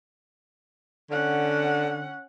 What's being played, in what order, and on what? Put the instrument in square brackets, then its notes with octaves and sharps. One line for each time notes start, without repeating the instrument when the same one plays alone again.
[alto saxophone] D3 [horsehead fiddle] C#4 F#5